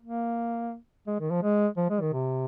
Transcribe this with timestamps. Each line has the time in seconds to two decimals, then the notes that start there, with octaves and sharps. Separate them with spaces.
0.02 A#3
1.07 G#3
1.20 D#3
1.30 F3
1.43 G#3
1.77 F3
1.90 G#3
2.01 D#3
2.13 C3